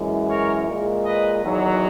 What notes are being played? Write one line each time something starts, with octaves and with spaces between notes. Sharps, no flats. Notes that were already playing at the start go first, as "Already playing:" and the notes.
Already playing: F#2 E3 G#3
A#4 C#5
A#2 G#3
B4 D#5
E2 D#3 F#3